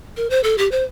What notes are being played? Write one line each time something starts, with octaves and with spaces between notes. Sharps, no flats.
A#4
C5
A4
G4
C5